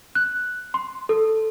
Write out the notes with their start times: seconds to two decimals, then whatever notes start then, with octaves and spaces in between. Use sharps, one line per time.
0.15 F#6
0.74 C6
1.09 A4